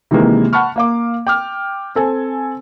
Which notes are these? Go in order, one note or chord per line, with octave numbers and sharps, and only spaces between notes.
C3 D#3 E3 G#3 A#3
F#5 A5 B5 C#6 F6
A#3 F5 D6
G5 D6 F6
C4 A4 G#5